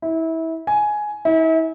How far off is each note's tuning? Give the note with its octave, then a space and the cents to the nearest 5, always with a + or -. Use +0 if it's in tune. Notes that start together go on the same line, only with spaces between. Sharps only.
E4 -25
G#5 +10
E4 -40